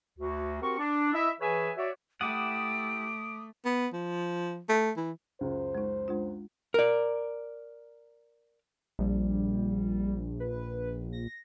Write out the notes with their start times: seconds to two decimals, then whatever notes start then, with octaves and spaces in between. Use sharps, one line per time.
0.19 D2 F#4
0.62 C4 F#4 G4 A#4 C#6
0.78 D4
1.13 E4 D#5 E5
1.41 E3 G#4 B4 C#5 E5 G#5
1.76 F#4 C#5 D5 E5
2.21 A3 E4 G4 F#5 D6 D#6 D7
3.65 B3
3.93 F3
4.69 A3
4.97 E3
5.41 C#2 F#2 C5
5.75 G#3 D#4
6.08 G#3 D4 F4
6.74 A#4 D5
8.99 A#1 G3
10.40 B4
11.13 A#6